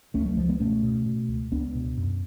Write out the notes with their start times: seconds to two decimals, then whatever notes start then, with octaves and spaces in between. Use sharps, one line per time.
0.14 C#2 A3 C#4
0.25 F#3 A3
0.37 C#2 F3 G#3
0.49 G#3 B3
0.60 B2 A3 C#4
0.83 B2
1.06 B2
1.28 C#2
1.52 C#2 B3 D4
1.75 B2
1.97 F#2